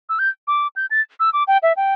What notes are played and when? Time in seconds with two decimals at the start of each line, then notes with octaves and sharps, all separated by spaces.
0.09 E6
0.19 G6
0.47 D6
0.76 G6
0.91 A6
1.20 E6
1.33 D6
1.47 G5
1.63 E5
1.77 G5